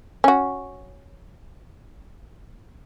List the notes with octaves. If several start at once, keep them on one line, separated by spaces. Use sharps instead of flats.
C#4 F#4